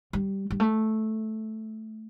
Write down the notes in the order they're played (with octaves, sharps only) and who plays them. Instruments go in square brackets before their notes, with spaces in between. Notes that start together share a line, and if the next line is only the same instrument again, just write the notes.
[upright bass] G3
G3
A3